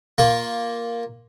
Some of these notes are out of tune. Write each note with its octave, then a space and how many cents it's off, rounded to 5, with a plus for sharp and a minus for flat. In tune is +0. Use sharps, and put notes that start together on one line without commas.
A#3 +5 F4 +0 C#6 -40